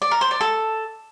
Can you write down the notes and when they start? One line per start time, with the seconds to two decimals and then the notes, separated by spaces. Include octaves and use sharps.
0.02 D5
0.11 A#4
0.21 C5
0.31 D5
0.41 A4